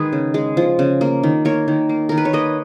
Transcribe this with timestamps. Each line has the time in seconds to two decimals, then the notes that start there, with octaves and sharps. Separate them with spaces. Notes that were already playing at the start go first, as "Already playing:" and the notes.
Already playing: D#3 G#3 G#4 B4
0.13 C#3
0.34 G#3
0.57 F3
0.79 C#3
1.01 A#3
1.23 D#3
1.45 A#3 A#4 C#5
1.68 D#3
1.89 A#3
2.09 D#3 A#4
2.18 B4
2.25 C#5
2.33 A#3 B4 D#5